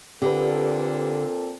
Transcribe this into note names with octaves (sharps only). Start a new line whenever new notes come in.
A#2 D3 C4 G4 A4 B4